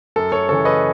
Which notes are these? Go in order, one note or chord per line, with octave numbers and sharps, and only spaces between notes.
F#2 A4
A4 C#5
C#3 E3 A4 C#5
B4 D#5